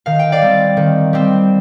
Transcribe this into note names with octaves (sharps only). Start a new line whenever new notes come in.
D#3 F5
G5
D5 F5
G3 C4
D#3
G3 C4